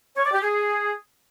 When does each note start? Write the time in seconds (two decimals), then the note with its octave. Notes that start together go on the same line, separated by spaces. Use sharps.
0.17 C#5
0.25 D5
0.34 G4
0.42 G#4